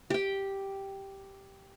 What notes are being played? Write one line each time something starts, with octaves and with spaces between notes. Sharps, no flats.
G4 G5